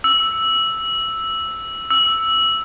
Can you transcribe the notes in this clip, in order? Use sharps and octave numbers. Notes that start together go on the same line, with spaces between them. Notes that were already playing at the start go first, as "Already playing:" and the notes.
E6
E6